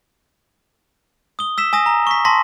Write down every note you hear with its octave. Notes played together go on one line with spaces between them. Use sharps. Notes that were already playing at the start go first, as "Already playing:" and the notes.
D#6 G7
E6 B6 E7
G#5 D#6 A#6
A#5
C#6 B6
A5 C6 A#6 B6